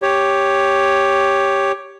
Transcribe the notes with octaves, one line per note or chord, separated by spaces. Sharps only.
G4 C#5